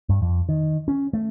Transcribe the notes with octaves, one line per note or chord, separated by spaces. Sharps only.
G2
F2
D#3
C#4
A3